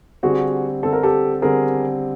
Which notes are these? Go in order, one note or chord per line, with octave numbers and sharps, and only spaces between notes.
D3 G3 C4 F#4 G#4
D3 G3 C4 A4
A#4
G4 A4
D3 G3 C4 G#4 A#4